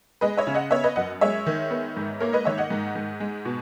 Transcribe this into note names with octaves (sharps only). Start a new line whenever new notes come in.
G#3 B4 D#5
C#5 E5
C#3
D#5 F#5
B3 C#5 E5
B4 D#5
F#2 D#5 F#5
G#3 C#5 E5
D#3
B3
G#2
A#3 A#4 C#5
B4 D#5
D#3 C#5 E5
D#5 F#5
G#2
G#2
G#3
B2